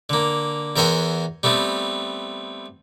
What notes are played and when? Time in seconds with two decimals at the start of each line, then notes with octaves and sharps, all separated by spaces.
0.10 D3 A#3
0.76 E2 A#4 C5 E5 F#5 G#5
1.43 G3 A3 B3 C4